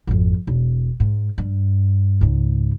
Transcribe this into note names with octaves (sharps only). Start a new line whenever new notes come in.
G#1 F2
E1
G#2
G2
C#2 G#2